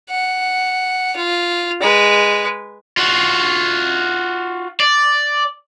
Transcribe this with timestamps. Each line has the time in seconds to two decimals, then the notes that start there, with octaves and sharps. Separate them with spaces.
0.10 F#5
1.16 F4
1.81 G#3 B4
2.97 F4 F#4
4.80 D5